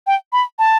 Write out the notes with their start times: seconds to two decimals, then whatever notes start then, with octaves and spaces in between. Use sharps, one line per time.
0.07 G5
0.33 B5
0.59 A5